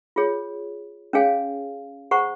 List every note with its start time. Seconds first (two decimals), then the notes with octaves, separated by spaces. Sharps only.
0.16 F4 G#4 C#5
1.13 C#4 G#4 C#5 F5 G#5
2.11 G#4 C5 F#5 A#5 C#6